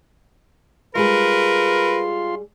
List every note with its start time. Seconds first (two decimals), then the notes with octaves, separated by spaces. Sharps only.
0.95 G3 G#3 F4 G#4 A#4 B4 C6